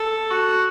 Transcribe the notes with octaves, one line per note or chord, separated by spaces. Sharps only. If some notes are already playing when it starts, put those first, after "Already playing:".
Already playing: A4
F#4